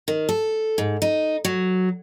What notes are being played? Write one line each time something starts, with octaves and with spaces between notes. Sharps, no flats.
D#3
A4
G#2
D#4
F#3